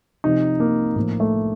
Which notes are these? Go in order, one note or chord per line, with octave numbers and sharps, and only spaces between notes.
C3 F3 D#4
A#3
A2 F3 A#3
A3